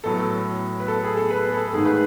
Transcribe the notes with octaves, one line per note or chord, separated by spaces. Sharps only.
A2 F#3 B3 A4
B4
A4
G#4
A4
B4
A4
G#2 D#3 A3 G#4
B4